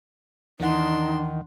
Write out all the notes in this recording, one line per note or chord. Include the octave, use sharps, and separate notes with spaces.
D#2 D#3 E3 D4 D#4 F#5 C6